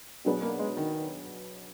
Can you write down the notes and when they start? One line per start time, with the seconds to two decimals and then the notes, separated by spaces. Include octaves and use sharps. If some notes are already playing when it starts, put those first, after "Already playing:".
0.25 B2 F#3 D4 G#4 B4
0.42 A#3
0.59 G#3
0.77 D#3